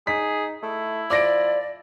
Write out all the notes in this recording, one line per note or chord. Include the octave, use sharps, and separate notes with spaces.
D#4 G#4 B6
A3 E4
F3 D5 D6 A#6 D7